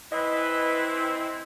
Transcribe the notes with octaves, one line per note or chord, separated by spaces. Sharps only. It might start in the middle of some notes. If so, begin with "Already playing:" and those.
E3 C4 E4 B4 D#5